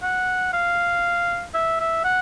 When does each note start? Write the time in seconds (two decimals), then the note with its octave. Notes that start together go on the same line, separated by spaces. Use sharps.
0.03 F#5
0.53 F5
1.54 E5
1.80 E5
2.05 F#5